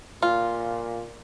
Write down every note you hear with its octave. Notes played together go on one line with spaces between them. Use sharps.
A#2 F4